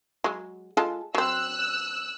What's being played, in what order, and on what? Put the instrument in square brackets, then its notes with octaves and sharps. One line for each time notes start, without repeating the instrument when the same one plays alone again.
[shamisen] F#3 G#3
G#3 F4 A4
[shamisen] F#3 C4 [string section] E6 F#6